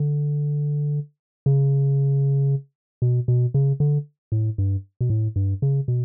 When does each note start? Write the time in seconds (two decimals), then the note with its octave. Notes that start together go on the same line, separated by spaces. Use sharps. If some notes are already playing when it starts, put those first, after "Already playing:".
Already playing: D3
1.46 C#3
3.02 B2
3.28 B2
3.54 C#3
3.80 D3
4.32 A2
4.58 G2
5.01 B2
5.10 A2
5.36 G2
5.62 C#3
5.88 B2